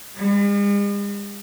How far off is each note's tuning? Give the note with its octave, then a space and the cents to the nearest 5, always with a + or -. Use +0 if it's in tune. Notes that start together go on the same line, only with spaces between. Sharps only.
G#3 -45